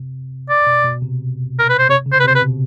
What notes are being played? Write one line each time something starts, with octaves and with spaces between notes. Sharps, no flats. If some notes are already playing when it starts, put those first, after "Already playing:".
Already playing: C3
D5
B2
B2
C3
A#4
B4
C5
C3 C#5
C#3
C5
B4
C3
C5
B4
B2